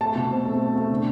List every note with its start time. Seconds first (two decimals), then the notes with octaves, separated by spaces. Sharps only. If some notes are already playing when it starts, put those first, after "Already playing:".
0.01 A3 A5
0.15 B2
0.30 C4
0.45 A3
0.60 C4
0.75 A3
0.90 D3